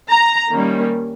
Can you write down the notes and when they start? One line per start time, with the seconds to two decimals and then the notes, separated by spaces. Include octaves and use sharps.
0.10 A#5
0.52 D#3 G3 A#3 C#4